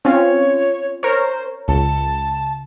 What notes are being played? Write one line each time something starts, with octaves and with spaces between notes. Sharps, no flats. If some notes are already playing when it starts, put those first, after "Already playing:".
C4 C#4 F4 C#5
A#4 C5 C#5
C#2 A5